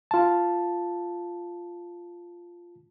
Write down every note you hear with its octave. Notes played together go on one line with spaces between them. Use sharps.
F4 A5